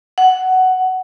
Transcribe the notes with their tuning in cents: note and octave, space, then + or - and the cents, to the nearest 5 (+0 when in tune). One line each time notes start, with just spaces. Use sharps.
F#5 +10